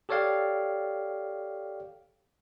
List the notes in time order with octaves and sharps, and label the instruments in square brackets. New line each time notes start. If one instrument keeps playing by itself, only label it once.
[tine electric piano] G4 A4 C#5 D5 F5 G5